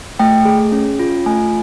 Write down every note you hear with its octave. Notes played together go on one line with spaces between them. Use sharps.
A3 G5
G#4
C#4
F4
A3 G#5